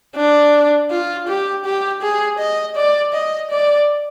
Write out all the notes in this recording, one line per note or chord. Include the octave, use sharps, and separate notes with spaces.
D4
F4
G4
G4
G#4
D#5
D5
D#5
D5